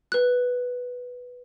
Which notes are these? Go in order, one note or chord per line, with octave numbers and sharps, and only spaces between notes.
B4 F#6